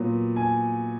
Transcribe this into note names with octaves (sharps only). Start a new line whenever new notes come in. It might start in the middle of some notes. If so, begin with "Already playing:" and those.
Already playing: A#2 F#3 B3
G#5